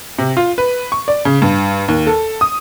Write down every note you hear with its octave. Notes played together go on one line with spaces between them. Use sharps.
C3
F4
B4
C#6
D5
C#3
G2
D#2
A4
D#6